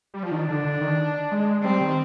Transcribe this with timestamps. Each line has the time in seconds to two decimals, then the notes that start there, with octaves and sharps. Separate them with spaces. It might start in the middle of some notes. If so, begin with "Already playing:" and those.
0.14 G3
0.23 F3
0.31 D#3 D4
0.48 D3
0.65 D3
0.81 D#3
1.31 G#3
1.63 G3 C4
1.81 D#3